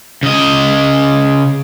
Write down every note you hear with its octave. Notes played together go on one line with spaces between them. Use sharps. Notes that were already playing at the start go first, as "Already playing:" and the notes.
C#3 D#5